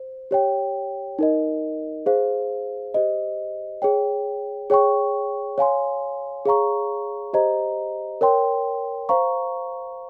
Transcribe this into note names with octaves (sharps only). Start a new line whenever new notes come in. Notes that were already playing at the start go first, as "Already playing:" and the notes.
Already playing: C5
G4 C#5 G5
D#4 A#4 D#5
G#4 C5 F5
G4 C5 D#5
G#4 C#5 G5
G#4 C#5 G5 C#6
C#5 F5 G#5 C6
G#4 C#5 F5 A#5 C#6
G4 C5 D#5 A#5
A#4 C#5 G5 C6
C5 F5 A#5 C#6